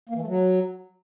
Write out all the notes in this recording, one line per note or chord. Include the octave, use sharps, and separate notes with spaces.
A#3
E3
A3
F#3